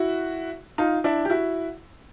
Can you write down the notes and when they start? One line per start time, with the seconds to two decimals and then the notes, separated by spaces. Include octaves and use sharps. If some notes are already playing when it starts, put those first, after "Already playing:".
Already playing: E4 F#4
0.78 D#4 F4
1.04 D4 E4
1.25 G4
1.30 E4 F#4